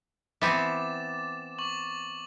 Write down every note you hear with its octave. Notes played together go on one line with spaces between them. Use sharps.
E3 B3 C4 D6 A6 E7
C#6 D6 F#7